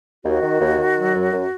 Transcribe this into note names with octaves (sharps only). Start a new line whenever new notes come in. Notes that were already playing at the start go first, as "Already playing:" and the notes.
D#2 F#4
D#3
D#2
D#3
F#3
F#2
F#2